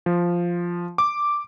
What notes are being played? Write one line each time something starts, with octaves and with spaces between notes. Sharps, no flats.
F3
D6